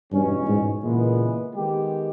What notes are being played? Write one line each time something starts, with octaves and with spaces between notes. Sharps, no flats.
E2 G2 B2 G#3 C#4
G#2
A#2 C#3 E3 G#3 B3
D#3 G#3 B3 G4